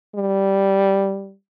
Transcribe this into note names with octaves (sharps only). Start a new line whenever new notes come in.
G3